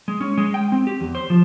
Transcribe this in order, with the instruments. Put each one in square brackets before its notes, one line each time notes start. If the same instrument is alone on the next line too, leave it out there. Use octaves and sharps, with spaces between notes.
[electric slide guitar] G#3
C#4
G#3
G5
C4
G4
E2
C5
F3